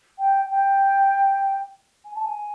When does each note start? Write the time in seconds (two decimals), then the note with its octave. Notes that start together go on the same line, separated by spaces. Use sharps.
0.19 G5
0.50 G5
2.05 G#5
2.15 A5
2.25 G#5